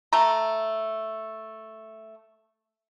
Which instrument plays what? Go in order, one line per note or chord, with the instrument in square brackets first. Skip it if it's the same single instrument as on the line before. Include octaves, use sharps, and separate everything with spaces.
[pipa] A3 A#5